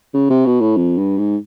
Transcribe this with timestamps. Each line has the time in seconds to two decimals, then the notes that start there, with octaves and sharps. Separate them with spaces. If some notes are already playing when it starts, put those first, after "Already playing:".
0.14 C#3
0.30 C3
0.46 B2
0.61 A2
0.77 F2
0.98 G2
1.18 G#2